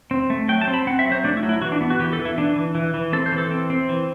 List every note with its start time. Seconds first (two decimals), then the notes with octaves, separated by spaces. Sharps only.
0.11 C4
0.30 A3
0.49 F#3 G5
0.61 A5
0.67 C4
0.74 B5
0.87 C4 F#5
0.99 E5
1.05 F#3
1.12 C5
1.24 A3 D4
1.37 E4
1.43 F#3
1.49 E4
1.62 E3 F#4
1.72 D4
1.81 B3
1.90 F#4
1.99 E3 G4
2.13 A4
2.19 E3
2.25 E4
2.37 E3 D4
2.56 E3
2.75 E3
2.94 E3
3.13 C4 A4
3.26 C5
3.32 E3
3.38 A4
3.51 C4
3.70 C4
3.89 E3